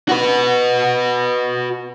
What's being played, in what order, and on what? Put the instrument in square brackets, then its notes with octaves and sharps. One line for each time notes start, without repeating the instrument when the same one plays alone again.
[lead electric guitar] F#4 B4